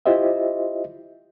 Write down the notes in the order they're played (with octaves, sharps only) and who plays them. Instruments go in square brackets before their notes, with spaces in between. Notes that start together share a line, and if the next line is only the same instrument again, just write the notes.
[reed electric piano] E4 F4 G4 C5 D#5 E5